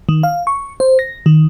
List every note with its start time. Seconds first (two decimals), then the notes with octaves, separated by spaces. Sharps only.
0.09 D#3
0.23 F5
0.47 C#6
0.80 C5
0.99 A#6
1.26 D#3